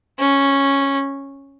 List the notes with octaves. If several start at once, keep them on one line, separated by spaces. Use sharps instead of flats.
C#4